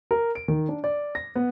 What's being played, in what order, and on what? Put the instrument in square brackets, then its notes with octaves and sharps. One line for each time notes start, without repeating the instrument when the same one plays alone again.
[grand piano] A#4
D7
D#3
D4
D5
A#6
B3